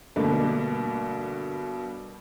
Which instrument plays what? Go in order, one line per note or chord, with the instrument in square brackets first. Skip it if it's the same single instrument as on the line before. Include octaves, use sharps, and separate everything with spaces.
[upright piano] G2 B2 [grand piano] D3 A3 A#3